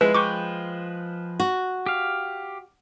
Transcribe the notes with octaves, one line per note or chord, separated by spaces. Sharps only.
F3 G#3 E4 B4
F3 B4 G5 C#6 D6
F#4
G4 F5